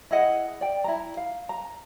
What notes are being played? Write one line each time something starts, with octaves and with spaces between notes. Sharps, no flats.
E4 G#4 D#5 F#5
D5 G5
E4 A#5
F5
A#5